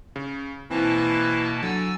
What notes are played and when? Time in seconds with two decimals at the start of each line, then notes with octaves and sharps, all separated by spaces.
0.16 C#3
0.71 B2 E3 A#3 C4 E4 A5
1.63 D3 F#3 G#5 E6 A6